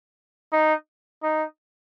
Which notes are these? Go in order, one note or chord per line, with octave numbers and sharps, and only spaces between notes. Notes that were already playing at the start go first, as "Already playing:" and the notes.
D#4
D#4